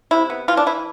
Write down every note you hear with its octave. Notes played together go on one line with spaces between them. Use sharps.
C3 E4
B3
E3 F4
D4
E3 E4